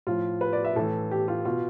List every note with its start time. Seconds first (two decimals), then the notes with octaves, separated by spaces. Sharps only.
0.07 A2 F3 F4
0.41 B4
0.53 D5
0.64 E5
0.76 A2 E3 A4
1.11 G4
1.28 F4
1.45 B2 F4